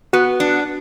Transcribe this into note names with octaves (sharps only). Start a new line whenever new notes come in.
B3 F#4
D4